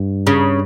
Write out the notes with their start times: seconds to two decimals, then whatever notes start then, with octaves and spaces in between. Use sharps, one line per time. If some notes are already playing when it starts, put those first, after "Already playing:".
Already playing: G2
0.27 C#3